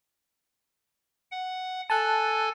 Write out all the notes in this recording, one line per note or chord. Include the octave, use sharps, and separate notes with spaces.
F#5
A4 G#5 A5 F#6